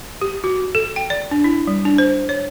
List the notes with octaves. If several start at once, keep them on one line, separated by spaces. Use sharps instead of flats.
G4
F#4
A4
G5
D5
D4
E4
G3
D4
C5
C#5